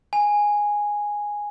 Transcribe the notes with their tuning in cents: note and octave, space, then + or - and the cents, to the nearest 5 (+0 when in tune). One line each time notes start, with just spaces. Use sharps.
G#5 -5